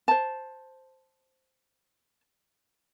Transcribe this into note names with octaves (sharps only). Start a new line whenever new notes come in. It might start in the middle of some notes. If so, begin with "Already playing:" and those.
C5 A5